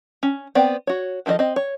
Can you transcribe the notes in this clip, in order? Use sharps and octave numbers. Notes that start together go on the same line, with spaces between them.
C#4
B3 C4 D5 G5
F#4 C#5
D#3 F3 E4 A4 D#5
C4 D#5
C#5